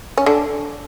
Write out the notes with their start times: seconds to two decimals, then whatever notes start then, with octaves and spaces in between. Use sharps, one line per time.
0.18 C#4
0.26 D3 D4